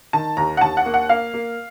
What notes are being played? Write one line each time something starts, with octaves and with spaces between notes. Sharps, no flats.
D#3 A5
D#2 A#5
F#5
D#2 A5
F#5
A#3
F#5
A#3 F5
A#3